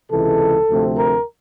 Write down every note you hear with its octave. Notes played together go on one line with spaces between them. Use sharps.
C#2 C3 E3 G#3 A4
D2 C3 F3 A3 C4
A#4